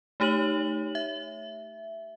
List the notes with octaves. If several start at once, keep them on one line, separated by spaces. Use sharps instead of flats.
A3 D#4 G4 C#5 F#7
E5